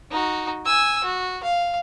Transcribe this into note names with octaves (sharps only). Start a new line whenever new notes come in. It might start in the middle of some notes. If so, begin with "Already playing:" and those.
D#4 F#4
G#5 E6
F#4
F5